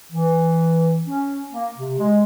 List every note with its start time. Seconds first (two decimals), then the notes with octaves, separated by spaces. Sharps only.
0.13 E3
1.07 C#4
1.53 A#3
1.78 C3
1.99 G#3